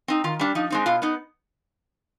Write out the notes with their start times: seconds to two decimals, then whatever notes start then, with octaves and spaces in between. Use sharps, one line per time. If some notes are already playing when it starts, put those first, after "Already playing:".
0.08 C4 D#4
0.24 D#3 F4
0.39 G3 D4
0.55 F3 D#4
0.70 G#3 C4 D#4
0.86 B2 F4
1.02 B3 D#4